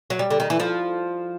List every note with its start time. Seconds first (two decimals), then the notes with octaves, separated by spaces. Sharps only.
0.10 F#3
0.19 G3
0.30 D3
0.40 D#3
0.50 E3
0.60 F3